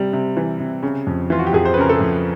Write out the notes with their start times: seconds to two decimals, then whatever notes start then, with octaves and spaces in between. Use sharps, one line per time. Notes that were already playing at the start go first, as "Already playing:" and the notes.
Already playing: C3 G3
0.13 C3
0.37 E3
0.60 C3
0.83 C#3
1.07 F2
1.30 E3 F4
1.39 F#4
1.47 G4
1.53 F2 G#4
1.65 C5
1.74 B4
1.77 C#3 A#4
1.89 A4
2.01 F2